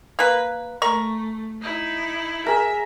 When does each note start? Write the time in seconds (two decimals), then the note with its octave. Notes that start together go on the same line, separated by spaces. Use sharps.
0.19 A#3 B4
0.82 A3 A#4 C#6
1.61 D#4 E4
2.46 G#4 A#4 E5